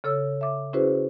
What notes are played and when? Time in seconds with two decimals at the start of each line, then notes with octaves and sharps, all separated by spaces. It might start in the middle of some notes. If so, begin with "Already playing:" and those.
0.04 C#3 A4 C#5 E6
0.41 E5 D6
0.73 C#4 E4 F#4 G#4 B4 C5